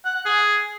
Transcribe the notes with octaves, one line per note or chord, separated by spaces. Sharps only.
F#5
F#5
G#4